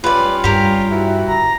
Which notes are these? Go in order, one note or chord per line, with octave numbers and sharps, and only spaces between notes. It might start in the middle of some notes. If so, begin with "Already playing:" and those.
F#2 G3 C#4 F4 B4 D5
G2 G4 A#4
E3 E4 F#4
D3 A#5